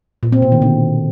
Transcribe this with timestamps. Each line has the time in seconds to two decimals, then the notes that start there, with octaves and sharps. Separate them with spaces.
0.23 A#2
0.32 C4
0.42 B2
0.52 D#3
0.62 D3